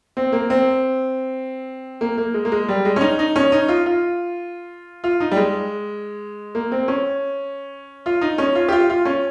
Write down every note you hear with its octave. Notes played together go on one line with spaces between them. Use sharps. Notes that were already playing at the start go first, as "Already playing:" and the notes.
C4
A#3
C4
A#3
A#3
G#3
A#3
G#3
G3
G#3
C#4
D#4
D#4
C#4
D#4
F4
F4
F4
D#4
G3
G#3
A#3
C4
C#4
F4
D#4
C#4
F4
G4
F4
F4
C#4